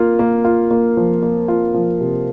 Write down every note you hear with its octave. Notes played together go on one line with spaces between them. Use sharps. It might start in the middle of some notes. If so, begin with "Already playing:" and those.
Already playing: A#3 F4
A#3
F4
A#3
F3
A#3
F4
F3
C3